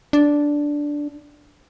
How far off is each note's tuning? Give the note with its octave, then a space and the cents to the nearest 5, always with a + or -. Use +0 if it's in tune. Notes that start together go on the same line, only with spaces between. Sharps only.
D4 -5